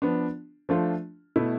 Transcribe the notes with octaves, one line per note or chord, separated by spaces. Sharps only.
F3 B3 D4
F3 A3 D4 F4
B2 A3 E4